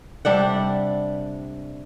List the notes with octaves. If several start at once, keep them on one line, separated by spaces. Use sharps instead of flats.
C3 G3 D4 F#5